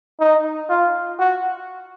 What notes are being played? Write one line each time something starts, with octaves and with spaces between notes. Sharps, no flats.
D#4
F4
F#4